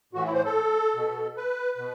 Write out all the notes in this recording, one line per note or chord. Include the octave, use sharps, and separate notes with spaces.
A2 E3 F#4
E4
C5
A4
B2
B4
B2